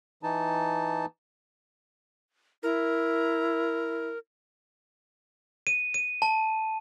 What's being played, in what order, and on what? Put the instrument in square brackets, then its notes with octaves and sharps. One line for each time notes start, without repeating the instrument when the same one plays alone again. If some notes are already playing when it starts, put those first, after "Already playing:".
[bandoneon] E3 D#4 A5
[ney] E4 [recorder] A#4
[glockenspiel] D#7
D#7
A5